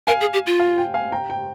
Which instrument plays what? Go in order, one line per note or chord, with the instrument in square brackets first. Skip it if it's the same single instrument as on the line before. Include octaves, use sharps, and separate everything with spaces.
[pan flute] A#4 [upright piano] F5 G#5
[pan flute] G#4
G4
F4
[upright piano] F5
G5
F5 G#5
G5 A#5
G5